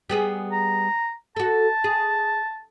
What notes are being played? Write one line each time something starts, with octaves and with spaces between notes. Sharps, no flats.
G3 B3 G#4
A#5
F#4 A4 A5
G#4